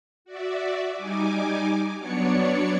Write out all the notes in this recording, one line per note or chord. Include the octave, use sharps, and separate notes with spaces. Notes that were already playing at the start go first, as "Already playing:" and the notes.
F#4 D5 E5
G3 D#4 G#5 D6
F#3 B3 D4 C#5 D5 C#7